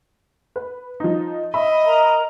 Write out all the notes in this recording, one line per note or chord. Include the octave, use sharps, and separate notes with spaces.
B4
F3 D#4
D#5 E5 B5
A#4 A#5